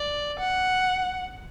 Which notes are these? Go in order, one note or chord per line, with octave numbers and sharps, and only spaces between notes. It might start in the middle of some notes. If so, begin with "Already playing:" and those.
Already playing: D5
F#5